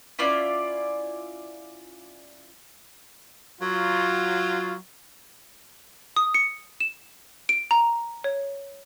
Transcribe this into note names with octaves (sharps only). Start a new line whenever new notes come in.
C#4 E4 F4 D5
F#3 F4
D#6
C#7
E7
D7
A#5
C#5